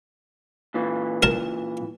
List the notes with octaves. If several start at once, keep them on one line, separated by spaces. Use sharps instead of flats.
A#2 E3
A#4 A5